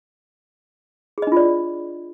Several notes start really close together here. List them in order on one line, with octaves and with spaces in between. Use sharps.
G#4 D#5 D4 F4 D5